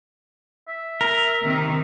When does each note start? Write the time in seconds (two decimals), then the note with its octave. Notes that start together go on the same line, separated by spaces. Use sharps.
0.68 E5
1.01 A#4
1.42 C3 D#3